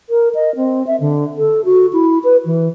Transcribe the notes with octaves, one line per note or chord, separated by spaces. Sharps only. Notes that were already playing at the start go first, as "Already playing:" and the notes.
A#4
D#5
C4
E5
D3
A4
F#4
E4
B4
E3